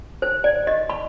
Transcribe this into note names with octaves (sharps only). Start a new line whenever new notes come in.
C5
D5
D#5
B5